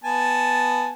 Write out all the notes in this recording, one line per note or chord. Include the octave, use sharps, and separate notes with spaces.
B3 G#5 A5